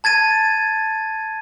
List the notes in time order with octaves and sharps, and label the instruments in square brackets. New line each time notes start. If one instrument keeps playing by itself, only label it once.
[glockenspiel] A5 G#6 A6 D#7